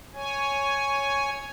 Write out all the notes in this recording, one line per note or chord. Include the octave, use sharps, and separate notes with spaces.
C#5 G#5